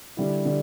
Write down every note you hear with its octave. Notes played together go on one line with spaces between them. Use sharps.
D3 G3 E4
D3 G3